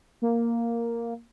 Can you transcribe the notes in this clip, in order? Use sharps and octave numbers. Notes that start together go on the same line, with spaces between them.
A#3